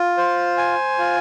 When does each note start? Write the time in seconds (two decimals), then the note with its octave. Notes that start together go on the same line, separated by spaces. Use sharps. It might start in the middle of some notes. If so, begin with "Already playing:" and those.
Already playing: F4
0.18 C5
0.58 G#5
0.99 F4